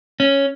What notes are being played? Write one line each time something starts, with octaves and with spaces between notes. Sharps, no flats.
C#4